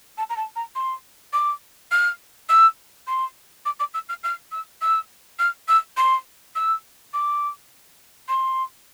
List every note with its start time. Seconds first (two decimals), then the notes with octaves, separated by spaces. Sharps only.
0.18 A5
0.30 A#5
0.36 A5
0.56 A#5
0.75 C6
1.33 D6
1.91 F6
2.49 E6
3.07 C6
3.65 D6
3.79 D6
3.94 E6
4.09 F6
4.23 F6
4.52 E6
4.81 E6
5.39 F6
5.68 E6
5.97 C6
6.55 E6
7.13 D6
8.28 C6